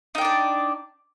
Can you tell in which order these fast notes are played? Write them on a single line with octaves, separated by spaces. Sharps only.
D#4 G5 D4 D5